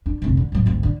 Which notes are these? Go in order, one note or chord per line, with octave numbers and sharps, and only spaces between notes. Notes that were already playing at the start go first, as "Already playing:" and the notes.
D4
F1 A#1
D3
A2 F#3
G#1 D2
D3